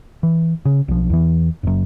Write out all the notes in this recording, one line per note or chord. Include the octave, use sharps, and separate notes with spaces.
E3
C#3
B1 F3
E2 E3
F#1 F#2